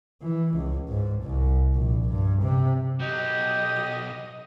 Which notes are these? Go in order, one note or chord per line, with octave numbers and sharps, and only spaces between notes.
E3
C#2
G#2
C2
A#1
G2
C3
B1 F#3 G4 D#5